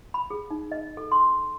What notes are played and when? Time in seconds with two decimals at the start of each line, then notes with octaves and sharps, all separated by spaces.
0.14 B5
0.30 G#4
0.50 D#4
0.72 D#5
0.97 A4
1.12 C6